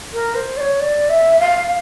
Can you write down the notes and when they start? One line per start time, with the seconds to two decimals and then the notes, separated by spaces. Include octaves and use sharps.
0.13 A#4
0.35 C5
0.57 D5
0.60 C#5
0.80 D5
1.09 E5
1.39 F5